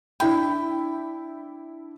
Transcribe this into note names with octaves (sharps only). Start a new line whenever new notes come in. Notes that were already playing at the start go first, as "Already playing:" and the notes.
D4 E4 G5 B5